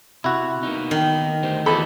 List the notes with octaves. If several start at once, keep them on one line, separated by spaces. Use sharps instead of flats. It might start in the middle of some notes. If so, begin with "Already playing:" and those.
C3 E4 F#4
A#3 B3 D#4
D#3
D2 G4 C5
E2 F#4 A4 D#5 G5 B5